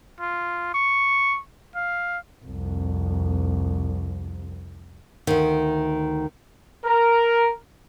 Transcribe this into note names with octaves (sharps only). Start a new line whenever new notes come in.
F4
C#6
F5
C2 F2
D2 D#3
A#4